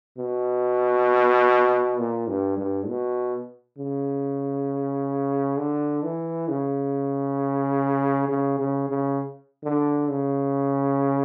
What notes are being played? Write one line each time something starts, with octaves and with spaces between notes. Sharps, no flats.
B2
A#2
G2
G2
B2
C#3
D3
E3
C#3
C#3
C#3
C#3
D3
C#3